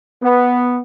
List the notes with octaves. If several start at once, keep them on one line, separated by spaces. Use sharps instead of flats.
B3